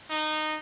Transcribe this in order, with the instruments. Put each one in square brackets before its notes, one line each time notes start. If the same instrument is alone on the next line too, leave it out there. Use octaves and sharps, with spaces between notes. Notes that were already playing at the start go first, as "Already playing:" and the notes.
[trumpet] D#4